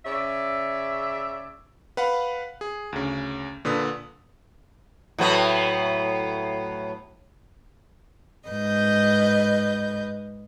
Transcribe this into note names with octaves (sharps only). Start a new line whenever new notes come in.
C#3 C#5 D5 E5
B4 F5 F#5 B5
G#4
D2 C#3
A#2 D3 B4 D#6
A2 F#3 B3
G#2 B4 D#5 G6